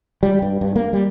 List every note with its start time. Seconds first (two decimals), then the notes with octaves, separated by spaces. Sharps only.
0.23 G3
0.42 G2
0.61 G2
0.76 A#3
0.93 G3